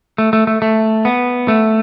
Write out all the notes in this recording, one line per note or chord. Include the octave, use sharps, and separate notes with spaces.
A3
A3
A3
A3
B3
A3